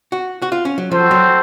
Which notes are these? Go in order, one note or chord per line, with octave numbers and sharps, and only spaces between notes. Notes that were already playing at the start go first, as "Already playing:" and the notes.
F#4
F#4
F4
C#4
F#3
F3 C4 F#4 A4 C5
F#3